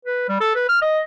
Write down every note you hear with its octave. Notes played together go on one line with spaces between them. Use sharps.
B4
G3
A4
B4
F6
D#5